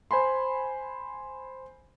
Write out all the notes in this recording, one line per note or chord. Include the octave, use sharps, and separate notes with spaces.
C5 G#5 B5 C6